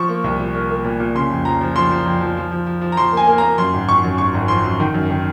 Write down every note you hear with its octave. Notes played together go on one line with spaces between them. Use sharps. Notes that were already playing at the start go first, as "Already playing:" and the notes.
Already playing: F3 C#6
A#3
C2
A#2
A#3
A#3
A#2
A#2
C#3 C6
F2
F3 A#5
F3
F3 C6
F3
F2
F3
F3
F3
F3
F3
A#5
F3 C6
A#3
G#5
A#3
A#5
A#3
F#2 C6
G#1
G#1 C#6
F#2
G#1 C#6
G#1
F3 C6
F#2
D#3
F#2
D#3